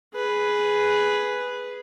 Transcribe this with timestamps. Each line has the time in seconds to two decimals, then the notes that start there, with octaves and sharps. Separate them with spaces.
0.14 G#4 B4